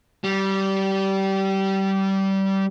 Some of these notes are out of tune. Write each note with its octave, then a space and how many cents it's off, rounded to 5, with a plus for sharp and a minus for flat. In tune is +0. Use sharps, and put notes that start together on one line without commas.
G3 -20